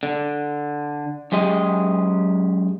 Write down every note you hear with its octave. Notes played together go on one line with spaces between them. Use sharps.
D3
F#2 G#3 G4 D#5